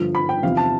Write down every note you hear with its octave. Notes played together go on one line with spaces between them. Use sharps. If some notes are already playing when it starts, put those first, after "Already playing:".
Already playing: G1 G2 F3
B5
G5
E2 C3 F3 F5
A5